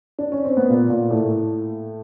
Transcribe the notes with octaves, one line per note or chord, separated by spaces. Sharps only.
D4
C#4
C4
B3
A#2 A#3
A#2 A#3
A2 A3